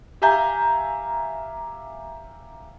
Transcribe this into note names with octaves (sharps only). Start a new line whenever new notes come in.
G4 E5 F5 G#5 A#5 G6